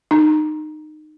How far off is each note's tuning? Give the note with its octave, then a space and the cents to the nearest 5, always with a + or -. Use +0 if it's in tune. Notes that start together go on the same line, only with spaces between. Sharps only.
D#4 -20 A#5 +10